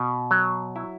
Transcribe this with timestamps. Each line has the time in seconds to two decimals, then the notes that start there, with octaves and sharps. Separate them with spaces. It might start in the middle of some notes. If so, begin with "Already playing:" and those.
Already playing: B2
0.31 F#3
0.76 E4